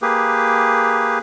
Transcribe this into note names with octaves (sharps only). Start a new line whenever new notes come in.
A#3 G4 G#4 B4